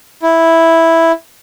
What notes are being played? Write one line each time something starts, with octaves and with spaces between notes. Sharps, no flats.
E4